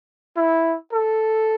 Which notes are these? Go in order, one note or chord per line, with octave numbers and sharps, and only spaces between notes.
E4
A4